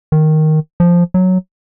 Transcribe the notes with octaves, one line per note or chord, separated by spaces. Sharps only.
D#3
F3
F#3